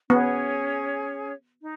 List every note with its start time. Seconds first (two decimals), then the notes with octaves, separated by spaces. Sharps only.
0.10 B3 C#4 G#4 C#5
1.61 D#4